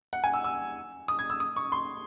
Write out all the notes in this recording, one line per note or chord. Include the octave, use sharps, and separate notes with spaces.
F#5
G#5
E6
E6
D#6
G#6
E6
D#6
C#6
C6